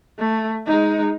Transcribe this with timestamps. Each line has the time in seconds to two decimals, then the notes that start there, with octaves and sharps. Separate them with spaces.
0.19 A3
0.67 G#3 D#4